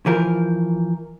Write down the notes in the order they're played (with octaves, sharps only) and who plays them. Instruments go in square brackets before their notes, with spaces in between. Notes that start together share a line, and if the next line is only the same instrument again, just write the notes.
[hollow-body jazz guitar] E3 F3 A#4